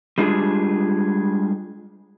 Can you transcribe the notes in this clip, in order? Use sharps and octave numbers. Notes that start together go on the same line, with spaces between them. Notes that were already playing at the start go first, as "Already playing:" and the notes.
G3 G#3 D4 F4 G#4